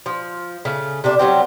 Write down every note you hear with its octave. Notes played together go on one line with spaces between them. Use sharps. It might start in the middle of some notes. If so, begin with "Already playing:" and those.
F3
C#3 A3
C3 A3 D4
F#3 G3 C4